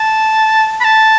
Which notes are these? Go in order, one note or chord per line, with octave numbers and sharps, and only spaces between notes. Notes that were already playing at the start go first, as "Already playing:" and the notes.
Already playing: A5
B5
A5